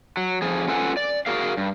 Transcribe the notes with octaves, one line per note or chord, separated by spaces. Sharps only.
F#3
F2 F3 G#4
C#4 F4 A4 B4 F#5 G#5
D5
F#4 G#4 A#4 F5
G2